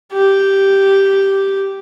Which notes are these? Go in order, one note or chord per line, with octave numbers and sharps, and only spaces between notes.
G4